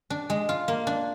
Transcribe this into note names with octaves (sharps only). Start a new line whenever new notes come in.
D4
G#3
F4
A#3
D4